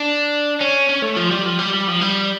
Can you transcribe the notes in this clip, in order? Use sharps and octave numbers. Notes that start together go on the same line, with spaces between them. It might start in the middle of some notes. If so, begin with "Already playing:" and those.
Already playing: D4
C#4
C#4
A3
F3
G3
F3
G3
G3
F3
G3